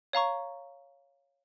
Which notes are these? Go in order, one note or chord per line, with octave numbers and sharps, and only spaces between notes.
C#5 F5 A#5 C#6